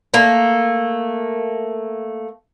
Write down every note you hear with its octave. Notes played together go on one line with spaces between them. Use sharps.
A3 A#3